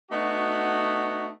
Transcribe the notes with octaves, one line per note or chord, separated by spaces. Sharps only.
A3 B3 D4 D#4 F#4